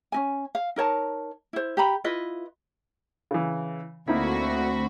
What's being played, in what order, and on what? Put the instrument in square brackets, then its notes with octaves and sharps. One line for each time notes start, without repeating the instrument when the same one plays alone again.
[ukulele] C#4 D#4 G#5
F5
D#4 A#4 C#5 A5
E4 C5
G4 A#5 B5
E4 F4 B4 D#5
[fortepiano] C#3 E3
[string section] D2 F#4 [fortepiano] A#3 D#4 E4 [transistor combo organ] C4 B5